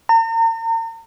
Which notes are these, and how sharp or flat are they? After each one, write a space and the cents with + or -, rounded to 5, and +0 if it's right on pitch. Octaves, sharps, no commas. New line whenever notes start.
A#5 -40